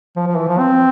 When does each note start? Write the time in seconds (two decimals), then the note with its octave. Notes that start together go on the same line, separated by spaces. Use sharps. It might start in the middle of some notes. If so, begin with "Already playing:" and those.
0.16 F3
0.26 F3
0.37 E3
0.48 F3
0.58 C4